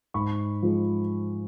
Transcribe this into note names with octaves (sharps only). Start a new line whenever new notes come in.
G#2 B5 C#6
F3 G#3